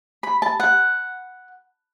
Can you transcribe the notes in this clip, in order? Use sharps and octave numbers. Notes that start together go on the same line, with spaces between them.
B5
A5
F#5